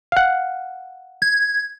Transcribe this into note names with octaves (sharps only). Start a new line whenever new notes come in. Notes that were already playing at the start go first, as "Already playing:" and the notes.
F5 F#5
G#6